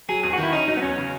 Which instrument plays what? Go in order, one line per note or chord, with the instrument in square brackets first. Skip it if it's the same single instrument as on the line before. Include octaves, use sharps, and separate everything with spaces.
[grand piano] F#3 [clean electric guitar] G#4
[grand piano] E2 [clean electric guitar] G#4
[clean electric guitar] F#4
[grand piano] D#3
[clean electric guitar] E4
[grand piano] C#4 [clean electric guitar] D#4
[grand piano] F#3 [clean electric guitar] D#4
[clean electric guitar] B3
[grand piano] E2 [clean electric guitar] C#4
[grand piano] C#3